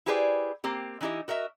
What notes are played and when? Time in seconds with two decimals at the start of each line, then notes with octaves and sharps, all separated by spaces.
0.06 E4 G4 G#4 B4 C5 D5
0.64 A#3 C4 G4
1.01 E3 D#4 E4 G4 D#5
1.28 F#4 A#4 D#5 E5